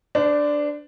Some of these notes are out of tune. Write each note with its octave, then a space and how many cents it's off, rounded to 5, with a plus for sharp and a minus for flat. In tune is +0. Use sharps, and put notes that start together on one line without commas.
D4 +0 C5 -40